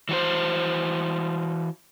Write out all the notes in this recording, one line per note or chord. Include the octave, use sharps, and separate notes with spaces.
E3 F#4 C5